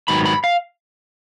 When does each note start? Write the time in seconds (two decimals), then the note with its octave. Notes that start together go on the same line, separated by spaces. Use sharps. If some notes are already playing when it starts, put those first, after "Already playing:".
0.08 G#2 D#3 F#3 B3 B5
0.26 B5
0.44 F5